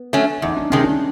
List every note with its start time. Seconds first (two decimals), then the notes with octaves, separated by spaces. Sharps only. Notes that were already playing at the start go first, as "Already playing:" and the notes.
Already playing: B3
0.13 F#3 A3 C#4
0.42 E2 D#4
0.57 D4
0.70 C3 D#3 G#3 C#4
0.84 D4